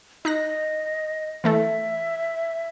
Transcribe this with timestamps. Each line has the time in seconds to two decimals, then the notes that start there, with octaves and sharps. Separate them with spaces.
0.25 D#4 D#5 F#6 A#6
1.44 E3 A3 A4 E5